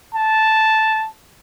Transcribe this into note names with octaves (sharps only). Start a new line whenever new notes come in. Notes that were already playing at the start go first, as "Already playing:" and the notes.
A5